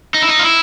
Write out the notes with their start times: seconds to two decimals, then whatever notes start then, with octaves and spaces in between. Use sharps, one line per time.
0.14 D#4
0.22 E4
0.29 D#4
0.39 F4
0.45 E4